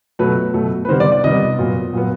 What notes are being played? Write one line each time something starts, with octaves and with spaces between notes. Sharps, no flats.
B2 F#3 A3 B4
B2 F#3 A3
B4
C3 D#3 G3 B3 C5
D5
D5
C3 D#3 G3 B3 D#5
A#2 F#3 B3
A#2 F#3 B3